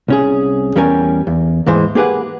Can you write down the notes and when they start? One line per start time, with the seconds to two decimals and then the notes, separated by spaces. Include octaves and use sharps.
0.08 C2 C#4 G#4
0.76 E2 G3 C#4 A#4 G#5
1.27 E2
1.66 D#2 G#2 E3 G#3 C5
1.95 A#3 G4 G#4 B4 F#5